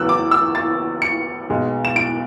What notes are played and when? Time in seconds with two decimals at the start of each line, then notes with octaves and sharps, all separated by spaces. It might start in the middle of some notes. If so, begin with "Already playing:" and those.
Already playing: E2 C#3 F#3 B3 E6 F#6
0.09 D6
0.31 E6
0.55 A6
1.02 C#7
1.50 B1 B2 G#3
1.85 E7
1.96 D7